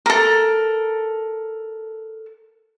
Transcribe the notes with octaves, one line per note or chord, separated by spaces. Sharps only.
A4 A#4